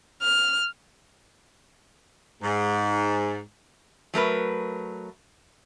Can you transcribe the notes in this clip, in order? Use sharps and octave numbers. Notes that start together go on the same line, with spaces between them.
F6
G#2
F#3 A3 A#4 B4